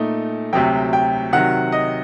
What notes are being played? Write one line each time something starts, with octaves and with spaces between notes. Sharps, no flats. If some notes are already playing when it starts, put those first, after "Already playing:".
Already playing: A#2 A3 D#4
D2 C3 F#3 G5
G5
C3 D#3 F#3 F#5
D#5